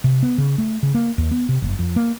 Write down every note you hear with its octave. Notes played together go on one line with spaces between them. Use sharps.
C3
B3
C#3
A3
C#3
A#3
D#2
B3
C3
F#1
F2
A#3